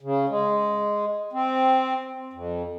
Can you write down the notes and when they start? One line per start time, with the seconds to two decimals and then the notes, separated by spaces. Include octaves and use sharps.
0.01 C#3
0.29 G#3
1.33 C4
2.33 F2